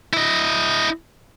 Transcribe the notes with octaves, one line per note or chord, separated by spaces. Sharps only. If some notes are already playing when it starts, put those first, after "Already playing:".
E4 D#5